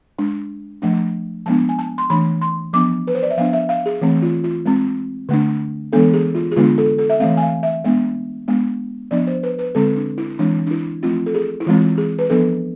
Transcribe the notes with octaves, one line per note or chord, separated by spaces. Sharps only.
G#3 D4
F3 A3 D4
F3 G#3 B3 D4 A5
G#5
A5
C6
E3 A3 D4 B5
C6
F3 B3 D4 D6
B4
C5
D5
E5
F3 B3 D4 F5
E5
F5
G#4
E3 A3 C4
F4
F4
G#3 C4
D3 A3 D4
E3 G#3 B3 D4 A4
G#4
F4
G#4
D3 G#3 B3 D4 F4
A4
A4
E5
E3 A3 C4 F5
G#5
F5
E5
G#3 B3 D4
G#3 B3 D4
F3 B3 D4 D5
C5
B4
B4
D3 G#3 C4 A4
D4
E4
E3 G#3 C4 D4
D4
E4
F3 A3 C4 F4
A4
G#4
E4
E3 G#3 C4 F4
G#4
B4
F3 B3 D4 A4